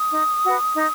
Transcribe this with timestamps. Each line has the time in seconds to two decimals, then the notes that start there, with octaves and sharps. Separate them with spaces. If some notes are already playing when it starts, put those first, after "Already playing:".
Already playing: D#6
0.11 D#4
0.44 F#4 B4
0.75 D#4